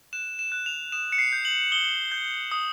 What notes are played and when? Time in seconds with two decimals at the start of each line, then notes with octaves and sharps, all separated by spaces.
0.13 F#6 E7
0.39 E7
0.52 F#6
0.66 F7
0.92 D#6 E7
1.12 C#7
1.18 C7
1.32 G6
1.45 F#7
1.72 D#6 G7
2.12 G6
2.51 D#6